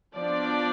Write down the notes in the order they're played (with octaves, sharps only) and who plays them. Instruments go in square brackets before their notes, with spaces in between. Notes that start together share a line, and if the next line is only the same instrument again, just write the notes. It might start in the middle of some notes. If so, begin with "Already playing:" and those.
[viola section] F3 B3 D4 D5